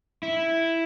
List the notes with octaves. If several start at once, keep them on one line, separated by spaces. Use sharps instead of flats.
E4